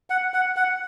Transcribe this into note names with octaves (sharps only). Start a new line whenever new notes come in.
F#5
F#5
F#5